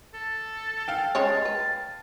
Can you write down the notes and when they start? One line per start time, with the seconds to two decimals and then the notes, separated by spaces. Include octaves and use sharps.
0.14 A4
0.88 F5 G5
1.15 G#3 C#4 C#5 A5
1.45 B4